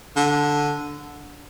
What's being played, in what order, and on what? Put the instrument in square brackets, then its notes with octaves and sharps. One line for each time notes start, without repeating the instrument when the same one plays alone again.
[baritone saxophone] D3